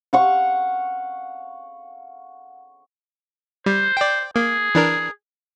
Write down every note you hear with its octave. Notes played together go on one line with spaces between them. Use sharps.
F5 F#5 C#6
G3 C5
D5 G5
A#3 G#4
E3 D4 A#4